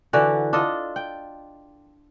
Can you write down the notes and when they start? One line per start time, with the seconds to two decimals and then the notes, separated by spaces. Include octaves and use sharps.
0.13 D3 E3 F#4 D5
0.53 D4 F4 A4 D#5
0.96 G5